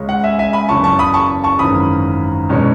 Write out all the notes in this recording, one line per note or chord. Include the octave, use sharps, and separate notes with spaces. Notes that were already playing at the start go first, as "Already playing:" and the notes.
Already playing: C#2 C#3 G#3 C#4
F#5
E5 G#5
E5 G#5
G#5 B5
F#1 E2 C#3 F#3 A5 C#6
A5 C#6
B5 D#6
A5 C#6
A5 C#6
G#1 F#2 C#3 E3 B5 D#6
E2 B2 G#3 C#4